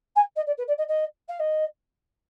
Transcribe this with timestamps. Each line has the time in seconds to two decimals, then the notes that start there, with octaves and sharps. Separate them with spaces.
0.16 G#5
0.36 D#5
0.46 D5
0.57 B4
0.67 D5
0.78 D#5
0.88 D#5
1.28 F5
1.39 D#5